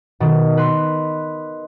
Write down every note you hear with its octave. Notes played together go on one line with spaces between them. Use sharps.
B2 D#3
B4 C6